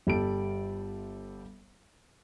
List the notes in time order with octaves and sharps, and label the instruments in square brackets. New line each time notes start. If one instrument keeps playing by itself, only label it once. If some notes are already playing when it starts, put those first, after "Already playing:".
[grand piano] G1 G3 A4 D7